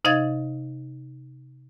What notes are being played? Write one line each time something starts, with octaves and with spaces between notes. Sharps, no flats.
C3 D#4 D#5 F5 G#6 A6